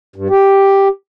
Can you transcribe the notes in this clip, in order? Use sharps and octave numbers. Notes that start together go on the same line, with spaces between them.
G2
G4